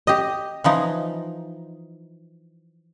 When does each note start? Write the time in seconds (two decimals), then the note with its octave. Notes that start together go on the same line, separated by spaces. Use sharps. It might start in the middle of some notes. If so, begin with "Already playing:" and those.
0.07 G4 D#5
0.64 E3 F3 D#4